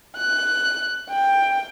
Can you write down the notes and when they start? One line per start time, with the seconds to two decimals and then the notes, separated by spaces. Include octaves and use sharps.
0.17 F#6
1.10 G5